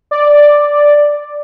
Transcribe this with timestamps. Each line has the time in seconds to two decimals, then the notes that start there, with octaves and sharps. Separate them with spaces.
0.11 D5